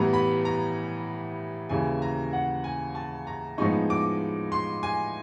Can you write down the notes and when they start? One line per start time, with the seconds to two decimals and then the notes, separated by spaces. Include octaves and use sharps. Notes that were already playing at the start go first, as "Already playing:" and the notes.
Already playing: A2 E3 G3 B3 A#5
0.13 B5
0.45 A#5
1.69 D#2 C#3 E3 G#5
2.02 A#5
2.33 F#5
2.64 G#5
2.95 A5
3.27 A#5
3.58 A2 F3 G#3 B3 D#4 C#6
3.90 D6
4.52 C6
4.83 G#5